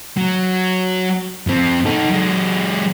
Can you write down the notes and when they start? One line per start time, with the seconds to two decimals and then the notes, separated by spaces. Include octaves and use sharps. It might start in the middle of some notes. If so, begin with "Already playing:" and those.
0.17 F#3
1.47 F2 C4
1.85 D#4 A4
2.10 F#3 G#3